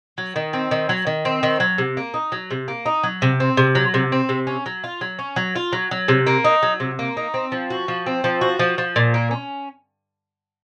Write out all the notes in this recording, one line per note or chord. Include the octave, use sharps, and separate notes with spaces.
F#3
D#3
C4
D#3
F#3
D#3
C4
D#3
F#3
C3
A#3
D#4
F#3
C3
A#3
D#4
F#3
C3
C4
C3
F#3
C3
C4
C3
C#4
F#3
F4
F#3
C#4
F#3
F4
F#3
F#3
C3
A#3
D#4
F#3
C3
A#3
D#4
C4
F3
F#4
F3
C4
F3
F#4
F3
F3
A#2
A#3
C#4